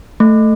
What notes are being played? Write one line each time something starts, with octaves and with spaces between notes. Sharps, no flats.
A3